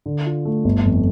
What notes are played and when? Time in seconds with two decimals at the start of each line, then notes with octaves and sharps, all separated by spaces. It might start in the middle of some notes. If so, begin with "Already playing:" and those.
0.06 D3
0.26 F4
0.45 A3
0.65 G1
0.85 F2